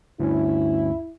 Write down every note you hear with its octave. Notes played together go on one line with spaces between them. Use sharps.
D2 G2 C#4 E4